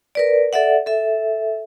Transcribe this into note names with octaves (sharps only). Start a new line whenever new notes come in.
A#4 B4 D5
A4 D5 E5 F#5
A4 E5